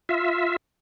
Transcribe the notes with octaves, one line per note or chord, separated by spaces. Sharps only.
F4 E5